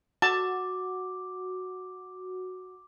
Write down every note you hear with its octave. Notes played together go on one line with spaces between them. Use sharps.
F#4 A5 D6